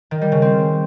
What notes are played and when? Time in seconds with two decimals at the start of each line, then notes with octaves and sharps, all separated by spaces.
0.11 D#3
0.22 G3
0.32 C#3
0.42 C4